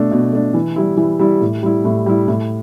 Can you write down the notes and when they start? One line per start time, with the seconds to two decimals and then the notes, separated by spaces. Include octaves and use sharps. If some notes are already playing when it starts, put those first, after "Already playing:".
Already playing: B2 A3 D4
0.11 B2
0.33 A3 D4
0.54 E3
0.76 G3 E4
0.97 E3
1.19 G3 E4
1.41 A2
1.63 G3 E4
1.85 A2
2.06 G3 E4
2.28 A2